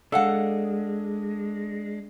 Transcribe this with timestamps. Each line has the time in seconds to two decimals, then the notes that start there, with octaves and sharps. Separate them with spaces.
0.12 G#3 D4 A4 F5 F#5